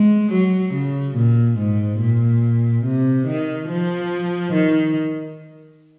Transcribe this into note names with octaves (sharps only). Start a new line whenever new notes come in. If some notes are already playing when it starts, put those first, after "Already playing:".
Already playing: G#3
F#3
C#3
A#2
G#2
A#2
C3
D#3
F3
D#3